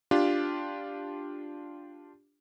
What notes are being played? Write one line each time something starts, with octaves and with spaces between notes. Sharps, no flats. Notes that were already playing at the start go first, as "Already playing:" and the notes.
D4 F4 G4